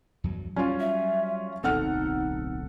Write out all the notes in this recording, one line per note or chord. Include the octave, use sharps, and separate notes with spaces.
E2 G2 F#3
F#3 G3 C#4 F4
E5
D1 B1 C4 D#4 A4 F#5 F6